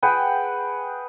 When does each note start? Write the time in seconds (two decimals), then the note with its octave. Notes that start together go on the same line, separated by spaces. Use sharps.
0.03 G#4 B4 F#5 G5